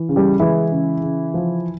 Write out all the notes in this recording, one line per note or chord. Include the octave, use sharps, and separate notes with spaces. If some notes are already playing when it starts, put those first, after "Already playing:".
Already playing: E3
C#3
G3 G4
E3 G#3 E4
C#3
C#3
F3